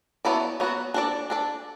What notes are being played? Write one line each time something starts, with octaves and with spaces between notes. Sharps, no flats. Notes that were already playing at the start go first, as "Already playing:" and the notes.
F#3 B3 E4 A4 D5
F#3 B3 F#4
D4 A4 D5
D4 A4 D5